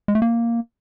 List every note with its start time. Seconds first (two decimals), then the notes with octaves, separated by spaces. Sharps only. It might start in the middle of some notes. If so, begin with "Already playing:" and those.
0.08 G#3
0.15 A3
0.22 A#3